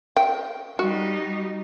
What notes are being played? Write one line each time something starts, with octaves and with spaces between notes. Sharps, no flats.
G5
G3 D#4 F#4